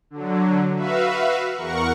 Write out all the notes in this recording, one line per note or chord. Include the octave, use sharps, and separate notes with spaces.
D3 F#3
F#4 B4 E5 F5
E2 A#4 F#5 C#6